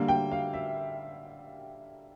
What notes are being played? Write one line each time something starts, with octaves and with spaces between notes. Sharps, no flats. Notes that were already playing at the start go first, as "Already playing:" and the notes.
Already playing: D3 G3 A#3
G5
F5
E5